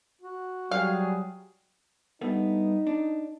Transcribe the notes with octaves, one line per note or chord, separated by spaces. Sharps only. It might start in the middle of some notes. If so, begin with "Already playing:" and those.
F#4
F#3 G3 G#4 F5
G2 A3 B3 D#4
D4